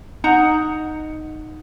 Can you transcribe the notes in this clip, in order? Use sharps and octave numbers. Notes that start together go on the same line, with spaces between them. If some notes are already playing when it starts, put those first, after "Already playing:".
D#4 F#5 A#5